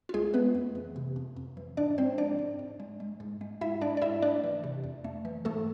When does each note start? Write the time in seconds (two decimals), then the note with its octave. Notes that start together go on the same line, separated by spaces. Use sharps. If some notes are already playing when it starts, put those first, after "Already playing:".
0.09 F4
0.14 C2 G#3 G#4
0.34 A3 B3 B4
0.55 F2
0.75 E3
0.96 C3
1.16 F2
1.37 F2
1.57 E3
1.77 G#2 D4 D5
1.98 G#3 C4 C5
2.18 F3 D4 D5
2.39 G#2
2.59 G#2
2.80 G#3
3.00 G#3
3.20 G#2
3.41 G#3
3.61 G#2 E4 E5
3.81 G#3 D4 D5
3.97 D5
4.02 G#2 E4 E5
4.22 A3 D4 D5
4.44 E3
4.64 C3
4.84 F2
5.04 A3
5.25 E3
5.45 G#2 A3 A4